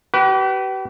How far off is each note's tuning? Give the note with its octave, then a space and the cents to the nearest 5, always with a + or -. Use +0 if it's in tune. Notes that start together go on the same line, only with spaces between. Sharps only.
G4 -40 B4 +0